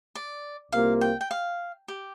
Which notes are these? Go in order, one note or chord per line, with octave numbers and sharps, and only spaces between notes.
D5
C2 C3 A#3 F4 F5
G5
G5
F5
G4